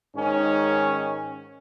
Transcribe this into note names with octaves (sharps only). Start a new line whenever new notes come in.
G#2 D#3 C#4